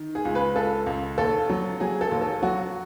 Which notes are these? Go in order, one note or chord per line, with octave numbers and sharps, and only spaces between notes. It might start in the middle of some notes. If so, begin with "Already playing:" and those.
Already playing: D#3
G#4
C#2
B4
C#2 A4
C#2
D#2 A4
F#3
F#3 G#4
A4
D#2
A4
F#3 F#4